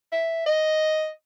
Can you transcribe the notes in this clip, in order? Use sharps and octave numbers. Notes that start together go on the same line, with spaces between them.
E5
D#5